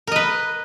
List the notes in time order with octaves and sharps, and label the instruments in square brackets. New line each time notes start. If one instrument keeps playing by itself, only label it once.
[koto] A#4
D#5
B4